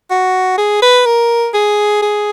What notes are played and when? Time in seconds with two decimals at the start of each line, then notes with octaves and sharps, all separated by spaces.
0.10 F#4
0.58 G#4
0.82 B4
1.06 A#4
1.54 G#4
2.02 G#4